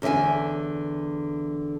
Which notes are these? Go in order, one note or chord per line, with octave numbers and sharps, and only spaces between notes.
E2 D3 D#5 E5 G#5